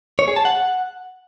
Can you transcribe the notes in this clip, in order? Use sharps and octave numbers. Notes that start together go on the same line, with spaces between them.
C#5
G#4
A5
F#5